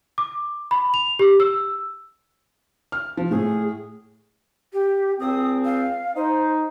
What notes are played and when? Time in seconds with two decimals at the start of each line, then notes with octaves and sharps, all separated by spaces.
0.18 D6
0.71 B5
0.94 F7
1.19 G4
1.40 E6
2.92 F6
3.17 F3
3.31 A2 G#4
4.73 G4
5.20 C#2 C4 D#6
5.65 F5
6.16 D#4 C5